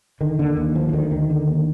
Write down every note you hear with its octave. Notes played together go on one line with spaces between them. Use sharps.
D3 D#3
D#2 D3
D#2 D#3
D2 F3
F3
D2 D#3
D2 D#3
D3
D#2